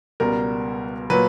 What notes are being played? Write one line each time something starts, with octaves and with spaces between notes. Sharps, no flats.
C#2 B2 G3 B3 A#4
A#2 F#3 B4